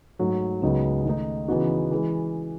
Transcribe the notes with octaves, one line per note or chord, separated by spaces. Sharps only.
G#2 F#3 A3
C#2 C#3 F#3 B3 D#4
D#3 A3 D#4
C#3 E3 B3 D#4 F#4
E3 G#3